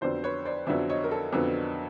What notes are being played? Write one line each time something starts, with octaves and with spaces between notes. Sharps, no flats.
F2 D3 F#3 B3 C5 D5
B4 C#5
C5 D5
F2 D3 F#3 B3 D5 E5
C#5 D#5
A#4
A4
F2 D3 F#3 B3